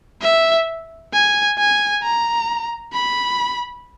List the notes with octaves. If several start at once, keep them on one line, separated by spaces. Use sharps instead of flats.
E5
G#5
G#5
A#5
B5